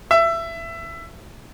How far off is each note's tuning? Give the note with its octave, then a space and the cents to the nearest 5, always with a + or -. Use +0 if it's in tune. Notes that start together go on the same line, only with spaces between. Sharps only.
E5 +20